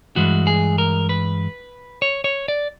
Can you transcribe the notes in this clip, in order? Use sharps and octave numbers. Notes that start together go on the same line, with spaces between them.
G2 E3 G#3 F#4
G#4
A#4
B4
C#5
C#5
D5